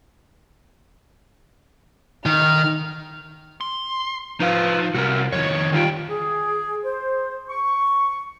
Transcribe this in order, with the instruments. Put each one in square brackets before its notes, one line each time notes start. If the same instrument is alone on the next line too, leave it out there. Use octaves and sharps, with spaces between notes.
[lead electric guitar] D#3 [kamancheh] F6
[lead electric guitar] C6
[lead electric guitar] F3 [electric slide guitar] D#4 B4 F5
[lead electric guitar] C2 [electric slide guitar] F#4 A4 A#4
[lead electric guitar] F2 D#3 [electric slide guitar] C#5
[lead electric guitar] D2 G5 [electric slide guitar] D#3 G3 F4
[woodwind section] G#4
C5
C#6